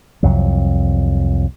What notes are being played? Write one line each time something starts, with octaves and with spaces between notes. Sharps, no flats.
C2 F2 F#3